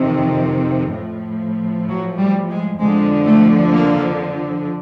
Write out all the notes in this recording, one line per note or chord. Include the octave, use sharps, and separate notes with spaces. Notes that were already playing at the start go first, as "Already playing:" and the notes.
Already playing: F2 C3 D#3
A2 F3
F#3
G3
G#3
F2 D3 F3 G#3
A3
A#3